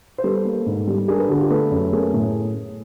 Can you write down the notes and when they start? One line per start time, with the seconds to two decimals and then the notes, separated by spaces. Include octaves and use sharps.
0.18 C5
0.24 G3 A4 B4
0.45 A#3
0.66 G#2
0.87 G3
1.08 D4 G#4 A#4
1.18 A4 B4
1.29 D3 F#4 G#4
1.40 F4 G4
1.50 A3 A4 B4
1.71 F#2
1.92 A3 G#4 A#4
2.14 A2